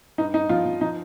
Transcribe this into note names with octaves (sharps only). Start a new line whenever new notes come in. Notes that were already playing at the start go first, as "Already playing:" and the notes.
G2 D#4
G2 D#4
F3 F4
F3
F3 D#4